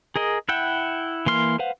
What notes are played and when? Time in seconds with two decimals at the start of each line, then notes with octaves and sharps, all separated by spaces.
0.16 G#4 A#4 D#5
0.49 E4 E5 F#5 G5
1.26 E3 A#3 C6 F6
1.59 B4 C5 F5 F#5